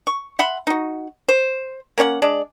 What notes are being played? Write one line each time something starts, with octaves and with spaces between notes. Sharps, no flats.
C#6
E5 F#5 B5 C6
D#4 F#4
C5
A#3 C#4 C#5 F#5
G#3 D4 D5